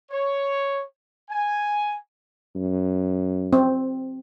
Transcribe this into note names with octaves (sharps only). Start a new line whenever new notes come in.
C#5
G#5
F#2
C4